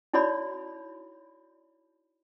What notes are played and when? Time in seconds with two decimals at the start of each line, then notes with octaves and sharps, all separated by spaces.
0.13 D#4 E4 F#4 C#5 D5 B5